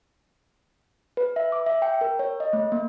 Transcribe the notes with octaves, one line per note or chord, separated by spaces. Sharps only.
B4
E5
D6
E5
G5
A#4
C#5
D#5
A3
A#3